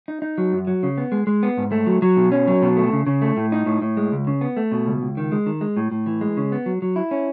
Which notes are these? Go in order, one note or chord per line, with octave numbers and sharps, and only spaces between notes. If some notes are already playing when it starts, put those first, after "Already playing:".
D#4
D#4
F#3
F#2
F#3
C#3
B3
G#3
G#3
B3
G#2
A3
F#3
F#3
B2
C#4
F#3
B2
A3
C#3
C#3
A3
A2
D#4
A2
A2
G#3
C#2
C#3
B3
A3
B2
C#2
C#2
D#3
G#3
D#3
G#3
A2
A2
E3
G#3
C#3
B3
F#3
F#3
E4
C#4